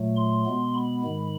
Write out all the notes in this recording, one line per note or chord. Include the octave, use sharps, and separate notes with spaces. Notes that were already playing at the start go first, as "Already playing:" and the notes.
Already playing: A#2 F#3 A3
C6
B2 G#3 B3
B5
G#2 D#3 G#3